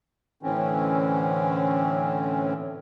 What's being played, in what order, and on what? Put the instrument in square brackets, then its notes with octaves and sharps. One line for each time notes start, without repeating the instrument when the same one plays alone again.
[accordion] A2 D3 E3 C4 C#4